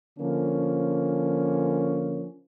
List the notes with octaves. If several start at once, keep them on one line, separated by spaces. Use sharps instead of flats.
D3 F3 A#3 C#4